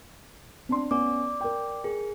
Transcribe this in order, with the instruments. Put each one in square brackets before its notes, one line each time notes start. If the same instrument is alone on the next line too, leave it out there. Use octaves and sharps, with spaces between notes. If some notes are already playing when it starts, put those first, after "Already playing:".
[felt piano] C4 D4 C6
[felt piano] B3 C#4 [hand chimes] D5 D6
[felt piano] A#4 G5
[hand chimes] G#4 [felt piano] A#4